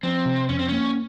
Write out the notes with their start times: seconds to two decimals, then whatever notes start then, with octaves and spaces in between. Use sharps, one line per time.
0.03 F3 C4
0.25 C3
0.49 F2 C#4
0.59 C4
0.68 A#3 C#4